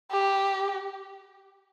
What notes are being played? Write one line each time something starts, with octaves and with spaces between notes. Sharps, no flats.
G4